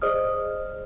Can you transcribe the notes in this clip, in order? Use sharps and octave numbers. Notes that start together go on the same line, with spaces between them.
G#4 C5 D5 D#5 D#6 F6